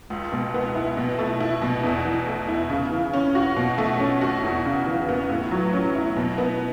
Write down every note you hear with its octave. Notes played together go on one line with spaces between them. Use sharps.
C#2
B2
B3
E4
B2
A3
E4
B2
E2
E3
A3
E4
C#3
E3
C#4
F#4
B2
A3
C#4
F#4
E2
C#3
E3
B3
A2
F#3
C#4
E4
B2
B3